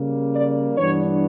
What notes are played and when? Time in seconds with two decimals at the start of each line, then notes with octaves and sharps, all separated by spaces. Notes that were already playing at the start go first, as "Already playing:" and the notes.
Already playing: C#3 G3 A#3
0.34 D5
0.77 G2 E3 B3 D4 C#5